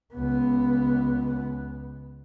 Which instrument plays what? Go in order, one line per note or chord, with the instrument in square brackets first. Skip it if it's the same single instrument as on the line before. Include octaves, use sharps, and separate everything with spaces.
[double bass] C#2 B3